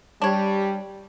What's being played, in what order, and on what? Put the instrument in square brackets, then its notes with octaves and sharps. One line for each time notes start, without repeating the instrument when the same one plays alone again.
[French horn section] G3 [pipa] D4 C#5